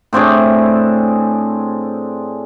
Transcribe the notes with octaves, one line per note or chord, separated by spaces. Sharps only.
A2 C4 D4 G#4